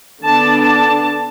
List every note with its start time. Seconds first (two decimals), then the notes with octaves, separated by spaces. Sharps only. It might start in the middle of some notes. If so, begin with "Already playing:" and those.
0.23 D3 B3 D4 A5
0.63 A5